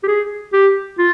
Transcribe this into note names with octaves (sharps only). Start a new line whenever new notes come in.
G4
G#4
G4
F4